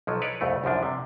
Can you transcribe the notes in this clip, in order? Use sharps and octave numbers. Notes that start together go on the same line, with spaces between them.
B1 F3 F#3
B4 C#5 D5
C2 F2 A3
C2 F#2 F3 D4
C3